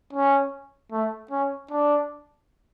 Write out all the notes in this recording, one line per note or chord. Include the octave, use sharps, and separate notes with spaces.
C#4
A3
C#4
D4